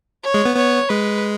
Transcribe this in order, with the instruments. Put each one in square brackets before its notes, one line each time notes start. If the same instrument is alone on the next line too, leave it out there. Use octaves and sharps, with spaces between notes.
[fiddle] C#5
[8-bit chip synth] G#3
B3
[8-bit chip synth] B3 [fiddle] C#5
[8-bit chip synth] G#3 [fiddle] B4